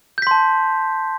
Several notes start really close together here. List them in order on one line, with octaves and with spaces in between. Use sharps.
G6 B6 C6 A5